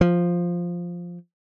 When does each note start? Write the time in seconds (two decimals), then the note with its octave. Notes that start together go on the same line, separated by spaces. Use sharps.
0.01 F3